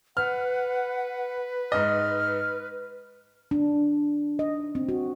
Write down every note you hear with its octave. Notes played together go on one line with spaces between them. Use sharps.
B4 F#5 F6
G#2 D#5 F6
D4
D#5
C4
F#4